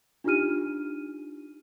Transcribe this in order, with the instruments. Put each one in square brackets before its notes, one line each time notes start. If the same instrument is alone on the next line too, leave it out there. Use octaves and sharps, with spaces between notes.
[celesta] D4 D#4 F4 G4 F6 D#7